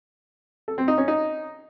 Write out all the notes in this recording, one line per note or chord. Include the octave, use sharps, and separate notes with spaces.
A4
C4
D#4
C#4
D#4